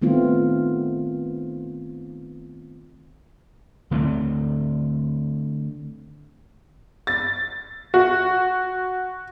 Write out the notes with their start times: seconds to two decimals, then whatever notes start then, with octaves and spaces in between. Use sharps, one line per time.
0.02 D#3 A3 B3 C4 F4
3.91 D3 A3 B3 C4
7.07 A6
7.94 F#4